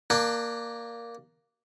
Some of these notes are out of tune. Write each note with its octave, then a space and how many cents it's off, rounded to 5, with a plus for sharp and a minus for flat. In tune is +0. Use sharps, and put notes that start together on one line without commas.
A#3 +0 D4 +20